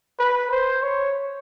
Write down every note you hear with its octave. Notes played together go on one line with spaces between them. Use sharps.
B4
C5
C#5